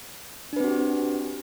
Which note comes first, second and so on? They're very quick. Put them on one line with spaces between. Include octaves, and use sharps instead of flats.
D4 B4 C4 F#4 G4